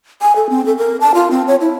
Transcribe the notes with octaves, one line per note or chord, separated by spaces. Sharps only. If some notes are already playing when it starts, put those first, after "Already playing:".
G#5
A4
C4
A4
A#4
A5
F4
C4
C#5
E4